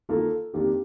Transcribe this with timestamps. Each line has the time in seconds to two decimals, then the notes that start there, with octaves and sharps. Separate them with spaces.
0.09 D#3 A#3 F4 A4
0.53 F2 D#3 A#3 D4 G4